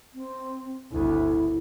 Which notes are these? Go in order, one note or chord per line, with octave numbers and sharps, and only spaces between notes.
C4
G1 D2 E4